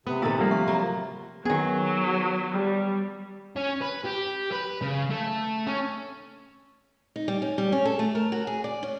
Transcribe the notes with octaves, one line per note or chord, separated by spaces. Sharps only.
C3 B3 D#6
A#2 D#3 A4 D5 A#5 E6 B6
D#3 F3 G3 A3 A#3
E5 C#6
F#3 A#5 B5
D#3 F#3 B3 G#4
G3
C#4
B4
G4
B4
C#3
A3
C#4
D#4
G3
C#4
G3
C#4
A4
A3
A#4
F#4
G#4
D5
C#4